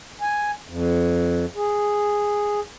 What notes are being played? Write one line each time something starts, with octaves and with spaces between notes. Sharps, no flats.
G#5
F2
G#4